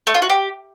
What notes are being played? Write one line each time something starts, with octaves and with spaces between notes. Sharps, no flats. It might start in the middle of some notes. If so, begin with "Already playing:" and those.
A3
F4
F#4
G4